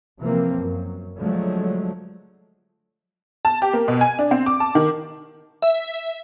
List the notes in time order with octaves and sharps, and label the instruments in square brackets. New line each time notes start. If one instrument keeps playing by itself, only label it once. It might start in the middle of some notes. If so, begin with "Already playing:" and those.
[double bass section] C3 E3 F3 A#3 C4
F#2
D3 F3 F#3 G#3 A3
[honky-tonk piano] A5
G4
A#3
B2
G#5
D4
C4
D6
A5
D#3
[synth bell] E5